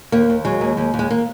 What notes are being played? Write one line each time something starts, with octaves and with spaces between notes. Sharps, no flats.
D#2 A#3
D#2
F#3 G#3
D#2
D#2
D#2
G#3
A#3